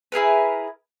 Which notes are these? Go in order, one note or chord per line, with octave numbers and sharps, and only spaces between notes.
E4 G#4 A#4 B4